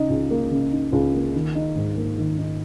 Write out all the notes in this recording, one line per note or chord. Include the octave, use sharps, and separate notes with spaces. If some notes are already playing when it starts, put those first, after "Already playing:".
Already playing: C#3 D#4
C#2
A#3
C#3
D#4
C#2
A#3
D#3
D#4
G#2
A#3
D#3
D#4